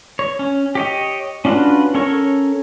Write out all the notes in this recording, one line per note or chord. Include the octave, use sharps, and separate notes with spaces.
C#5
C#4
G4 C#5 D#5
C#4 D4 F4 F#4 B4
C#4 A4 A#4 C#5 C#6